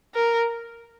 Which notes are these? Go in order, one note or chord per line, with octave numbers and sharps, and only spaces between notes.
A#4